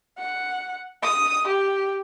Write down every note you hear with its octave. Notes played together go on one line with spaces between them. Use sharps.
F#5
D#6
G4